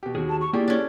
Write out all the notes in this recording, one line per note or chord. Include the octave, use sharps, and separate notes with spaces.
B2 G4
D#2 F#4 G#4
A5
C#6
A#3 E4 F4 G4 G#4 D5
C#4 D4